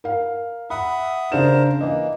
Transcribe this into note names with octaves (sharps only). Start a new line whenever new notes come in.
A#4 F5
E5 F#5 B5 D#6
C#3 D4 A#4 C5 E7
E3 A#3 D#5